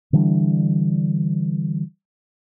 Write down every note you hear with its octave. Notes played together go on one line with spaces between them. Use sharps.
D3 E3 G3 D4